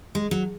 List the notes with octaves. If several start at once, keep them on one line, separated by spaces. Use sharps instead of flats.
G#3
F#3